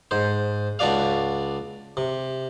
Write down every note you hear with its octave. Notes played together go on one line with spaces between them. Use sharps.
G#2 C5
C#2 D4 F#4 D5 F5
C3